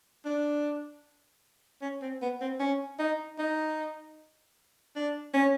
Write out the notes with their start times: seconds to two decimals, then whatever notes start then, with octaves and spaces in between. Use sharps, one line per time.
0.25 D4
1.81 C#4
2.02 C4
2.22 B3
2.41 C4
2.60 C#4
2.99 D#4
3.39 D#4
4.96 D4
5.34 C#4